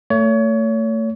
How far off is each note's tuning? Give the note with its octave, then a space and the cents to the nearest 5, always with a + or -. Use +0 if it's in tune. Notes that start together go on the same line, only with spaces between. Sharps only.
A3 +30 C#5 +30